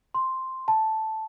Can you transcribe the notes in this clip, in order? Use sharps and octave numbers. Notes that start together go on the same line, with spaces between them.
C6
A5